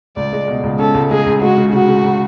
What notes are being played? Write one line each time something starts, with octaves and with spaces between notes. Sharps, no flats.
C#2 D5
G#3
B2
C#2
C#4 A4
C#2
G#3 G#4
C#2
G#3 F#4
C#3
C#3 F#4
C#3
C#3